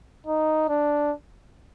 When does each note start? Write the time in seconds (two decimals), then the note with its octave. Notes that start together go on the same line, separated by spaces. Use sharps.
0.27 D#4
0.69 D4